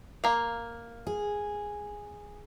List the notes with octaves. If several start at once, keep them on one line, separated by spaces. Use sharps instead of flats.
A#3 F5
G#4